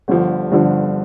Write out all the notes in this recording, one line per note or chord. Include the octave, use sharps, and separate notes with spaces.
G1 G2 D3 F3
G1 G2 D3 F3